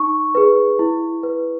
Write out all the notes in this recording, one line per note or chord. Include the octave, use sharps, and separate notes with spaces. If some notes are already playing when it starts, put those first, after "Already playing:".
Already playing: D#4 C#6
G#4 B4
E4
B4